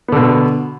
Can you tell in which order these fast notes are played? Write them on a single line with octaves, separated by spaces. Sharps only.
B3 D3 B2